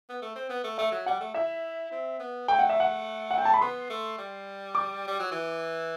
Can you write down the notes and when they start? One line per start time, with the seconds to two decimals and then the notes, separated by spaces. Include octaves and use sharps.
0.09 B3
0.21 A3
0.35 C4
0.50 B3
0.64 A3
0.78 A3 E5
0.92 F#3
1.06 G3 F#5
1.20 A3
1.34 E4 E5
1.91 C4
2.19 B3
2.48 A3 G5
2.59 F#5
2.70 E5
2.80 F#5
3.31 F#5
3.38 G5
3.45 A5
3.54 B5
3.61 B3 C6
3.90 A3
4.18 G3
4.75 D6
5.07 G3
5.19 F#3
5.31 E3